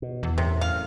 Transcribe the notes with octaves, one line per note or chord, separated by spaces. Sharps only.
B2
E2
F#2 A2 C3
F5